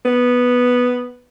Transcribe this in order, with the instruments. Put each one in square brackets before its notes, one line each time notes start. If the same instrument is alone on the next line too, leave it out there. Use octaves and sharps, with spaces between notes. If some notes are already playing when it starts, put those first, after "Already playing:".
[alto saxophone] B3